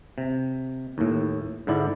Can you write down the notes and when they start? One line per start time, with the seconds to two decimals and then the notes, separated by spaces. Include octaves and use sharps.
0.18 C3
0.98 D#2 A2
1.67 G#2 D3 E4 D5